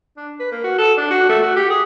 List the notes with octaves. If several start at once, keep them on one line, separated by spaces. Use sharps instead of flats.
D4
B4
A#3
F#4
A4
D4
F#4
A3
F#4
G4
G#4